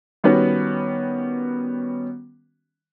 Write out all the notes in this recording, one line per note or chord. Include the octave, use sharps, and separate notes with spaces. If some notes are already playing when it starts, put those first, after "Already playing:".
D#3 G3 B3 C#4 F#4 B4